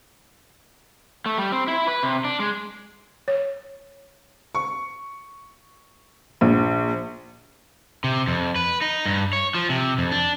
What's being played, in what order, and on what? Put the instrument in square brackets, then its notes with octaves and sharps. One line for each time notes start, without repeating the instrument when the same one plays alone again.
[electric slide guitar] A3
G3
C4
E4
B4
C3
D4
G#3
[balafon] C#5
[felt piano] C#6
A#1
[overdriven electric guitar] C3
F2
B4
D#4
G2
C#5
F3
C3
F2
D4